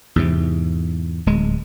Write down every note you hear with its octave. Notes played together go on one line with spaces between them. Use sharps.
E2 G#2 C3
D1 G#3